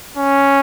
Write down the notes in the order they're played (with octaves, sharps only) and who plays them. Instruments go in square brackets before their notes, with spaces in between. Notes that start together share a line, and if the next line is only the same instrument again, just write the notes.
[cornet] C#4